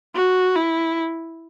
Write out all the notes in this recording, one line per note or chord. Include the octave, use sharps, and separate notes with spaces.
F#4
E4